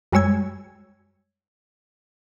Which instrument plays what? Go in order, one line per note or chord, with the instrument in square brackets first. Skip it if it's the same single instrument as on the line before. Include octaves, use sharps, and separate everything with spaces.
[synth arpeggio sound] F#2 G3 G#3 C#5 E6 G#6